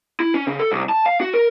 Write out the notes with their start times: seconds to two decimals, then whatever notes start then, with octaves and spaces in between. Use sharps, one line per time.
0.20 E4
0.34 C#4
0.47 C#3
0.60 A4
0.72 C2
0.89 A5
1.06 F5
1.21 F#4
1.34 A#4